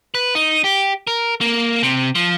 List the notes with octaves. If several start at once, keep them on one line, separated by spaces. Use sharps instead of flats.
B4
D#4
G4
A#4
A#3
C3
F3